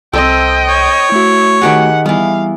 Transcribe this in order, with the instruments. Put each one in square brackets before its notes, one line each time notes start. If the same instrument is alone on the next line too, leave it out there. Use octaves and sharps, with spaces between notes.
[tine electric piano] C2 [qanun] C4 A4 [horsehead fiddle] D#5 G5
[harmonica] C#5
[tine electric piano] A3 F#4 [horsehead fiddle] E4
[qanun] D#3 G4 G#4 [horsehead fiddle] F#5
[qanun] E3 B3 [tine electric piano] G3 [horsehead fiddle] F5